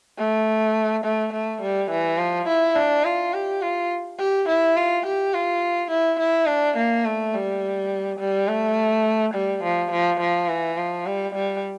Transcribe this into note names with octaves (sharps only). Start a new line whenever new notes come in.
A3
A3
A3
G3
E3
F3
E4
D4
F4
G4
F4
G4
E4
F4
G4
F4
E4
E4
D4
A#3
A3
G3
G3
A3
G3
F3
F3
F3
E3
F3
G3
G3